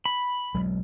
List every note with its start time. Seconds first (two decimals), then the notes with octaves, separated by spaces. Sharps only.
0.06 B5
0.54 B1 F#3 G#3